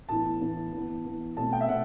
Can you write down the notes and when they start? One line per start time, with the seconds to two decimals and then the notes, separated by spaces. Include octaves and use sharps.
0.09 A2 E3 B3 A5
0.41 A2 E3 B3
0.73 E3 B3
1.05 E3 B3
1.37 B2 A3 C4 A5
1.53 G5
1.61 E5
1.68 B2 A3 C4 F#5